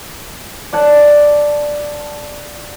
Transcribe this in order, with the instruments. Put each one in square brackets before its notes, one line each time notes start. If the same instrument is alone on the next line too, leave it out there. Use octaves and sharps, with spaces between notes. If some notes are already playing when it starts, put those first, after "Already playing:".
[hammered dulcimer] D5 F#5 A5